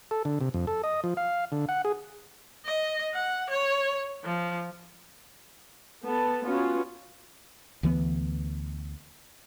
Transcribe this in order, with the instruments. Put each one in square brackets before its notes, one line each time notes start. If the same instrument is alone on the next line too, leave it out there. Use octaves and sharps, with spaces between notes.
[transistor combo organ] A4
D3
C3
F2
A4
D#5
F3
F5
D3
F#5
G#4
[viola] D#5
F#5
C#5
F3
[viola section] B3 A4 A5
B3 C#4 F4 F#4
[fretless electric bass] D2 E3 B3